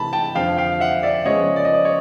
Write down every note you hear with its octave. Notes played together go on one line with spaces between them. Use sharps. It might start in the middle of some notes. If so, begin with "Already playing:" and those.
Already playing: C3 E3 A3 A5 B5
G5 A5
F2 D3 F3 F5 G5
F5 G5
E5 F#5
D5 E5
C#3 F3 G#3 B3 C#5 D#5
D5
D#5
D5
C#5